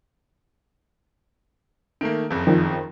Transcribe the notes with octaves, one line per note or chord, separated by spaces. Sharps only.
D#3 A3 A#3 D7
F#1 F2
D#3 F3